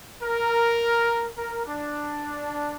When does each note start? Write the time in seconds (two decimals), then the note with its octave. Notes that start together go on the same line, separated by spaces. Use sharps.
0.23 A#4
1.37 A#4
1.66 D4